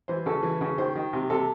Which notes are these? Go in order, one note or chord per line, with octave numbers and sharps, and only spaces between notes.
E3 C5
C#3 A4
E3
C#3
D#3 C5
D#3
C3
C3 A4